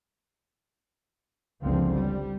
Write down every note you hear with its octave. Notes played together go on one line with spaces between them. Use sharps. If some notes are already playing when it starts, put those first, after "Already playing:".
F#1 C#2 D3 F3 C4
G3